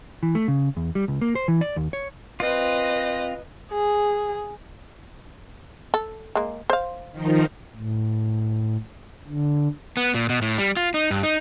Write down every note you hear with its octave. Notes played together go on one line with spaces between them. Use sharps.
E3
A3
C#3
E2
G3
C#2
A#3
C5
E3
D5
D#2
C#5
C4 F4 B4 D#5
G#4
A4
G#3 A#3
C5 F5
D#3 F3 D#4
A2
D3
B3
A#2
B2
A2
G3
F4
D#4
G2
D#4